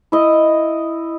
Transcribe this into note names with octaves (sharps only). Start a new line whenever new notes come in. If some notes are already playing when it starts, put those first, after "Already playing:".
E4 D#5